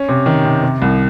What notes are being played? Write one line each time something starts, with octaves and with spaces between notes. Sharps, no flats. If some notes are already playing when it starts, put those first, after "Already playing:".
Already playing: C#4
C3
D#3
C3
C3
C2